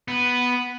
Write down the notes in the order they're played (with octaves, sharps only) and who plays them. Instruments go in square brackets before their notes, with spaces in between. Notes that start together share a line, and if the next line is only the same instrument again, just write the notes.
[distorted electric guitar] B3